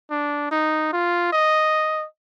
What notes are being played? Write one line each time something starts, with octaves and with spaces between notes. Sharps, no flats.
D4
D#4
F4
D#5